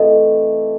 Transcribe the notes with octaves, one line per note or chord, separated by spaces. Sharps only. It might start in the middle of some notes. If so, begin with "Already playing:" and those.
Already playing: C3 E3 A3 D#5